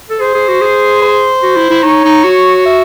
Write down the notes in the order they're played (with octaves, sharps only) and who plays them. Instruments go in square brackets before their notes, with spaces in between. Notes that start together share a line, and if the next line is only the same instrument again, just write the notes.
[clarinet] A4
[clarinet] G#4 [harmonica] C5
[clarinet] G#4
F#4
G#4
[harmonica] C5
[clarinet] F#4
E4
E4
[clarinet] D#4 [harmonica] C#5
[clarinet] D#4
F#4
[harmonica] E5